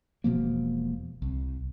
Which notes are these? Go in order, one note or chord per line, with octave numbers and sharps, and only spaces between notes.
E1 B2 F3 A#3
C2